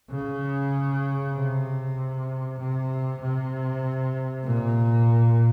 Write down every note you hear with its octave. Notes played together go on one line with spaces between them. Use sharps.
C#3
C3
C3
C3
A#2